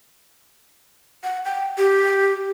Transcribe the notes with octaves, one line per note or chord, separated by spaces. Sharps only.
F#5
G5
G4